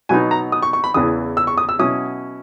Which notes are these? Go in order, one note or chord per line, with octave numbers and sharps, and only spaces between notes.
B2 F#3 B3 D#4 G#5
A#5
D#6
C#6
C#6
B5
E2 C#3 E3 D#6
E6
C#6
D#6
E6
B2 F#3 C#4 E4 D#6